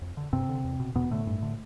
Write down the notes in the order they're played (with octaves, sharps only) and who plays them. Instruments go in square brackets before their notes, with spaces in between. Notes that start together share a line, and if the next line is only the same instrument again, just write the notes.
[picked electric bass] F2
D3
G2 C3 C4
D3
E2
B2
E2 B2 B3
A2 D3 A3
G2
D3